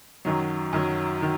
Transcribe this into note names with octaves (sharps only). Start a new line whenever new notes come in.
F#2 D#3 F#3
F#2 D#3 F#3
D#3